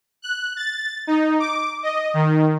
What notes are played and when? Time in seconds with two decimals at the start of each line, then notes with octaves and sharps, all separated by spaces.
0.22 F#6
0.56 A6
1.07 D#4
1.39 D6
1.83 D#5
2.14 D#3